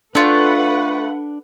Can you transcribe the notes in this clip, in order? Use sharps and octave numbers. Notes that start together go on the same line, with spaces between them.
A3 D4 F4 A4 B4 F#5